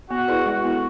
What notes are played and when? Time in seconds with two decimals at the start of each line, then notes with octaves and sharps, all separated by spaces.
0.10 B3 F#4
0.28 E4 G#4 B4 D5
0.46 G#3 F#4
0.64 B3 E4 A4